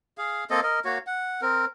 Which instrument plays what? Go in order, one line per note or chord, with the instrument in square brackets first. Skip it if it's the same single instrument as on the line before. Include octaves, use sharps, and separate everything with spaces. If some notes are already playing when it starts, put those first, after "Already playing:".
[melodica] G#4 F5
A#3 C4 A4 D#5
A#4 D#5
A#3 F#4 C#5
F#5
C4 A#4